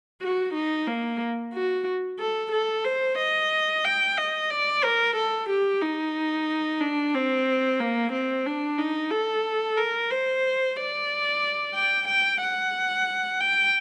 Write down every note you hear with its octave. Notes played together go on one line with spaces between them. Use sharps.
F#4
D#4
A#3
F#4
A4
A4
C5
D#5
G5
D#5
D5
A#4
A4
G4
D#4
D4
C4
A#3
C4
D4
D#4
A4
A#4
C5
D5
G5
G5
F#5
G5